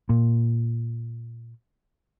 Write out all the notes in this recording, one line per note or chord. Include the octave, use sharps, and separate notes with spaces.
A#2